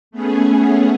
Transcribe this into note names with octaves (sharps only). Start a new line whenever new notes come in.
A3 B3 C#4 G#4